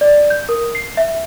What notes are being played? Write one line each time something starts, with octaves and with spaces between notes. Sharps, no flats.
D5
G6
A#4
C7
E5